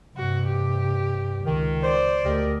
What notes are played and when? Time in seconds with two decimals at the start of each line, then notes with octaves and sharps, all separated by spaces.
0.17 G2 C3 F#4
0.47 G4
1.45 C#2 D#3
1.83 C5 D5
2.24 D2 G4 A#4 D#5